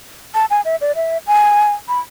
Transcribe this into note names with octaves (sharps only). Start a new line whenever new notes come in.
A5
G#5
E5
D5
E5
G#5
B5